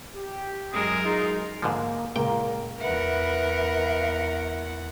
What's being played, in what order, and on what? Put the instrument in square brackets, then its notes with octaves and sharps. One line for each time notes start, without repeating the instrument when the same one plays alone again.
[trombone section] G4
[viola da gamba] F#2 G#3 A#4 [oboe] G#4
[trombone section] D#4 [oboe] F4 [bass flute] G#4
[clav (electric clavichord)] G#2 D3 F3 [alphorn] A#3
[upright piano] C#2 A#2 [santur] A#3 [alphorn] A#4 [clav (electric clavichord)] G5
[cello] E2 F#5 [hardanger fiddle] A#4 [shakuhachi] B4 [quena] E5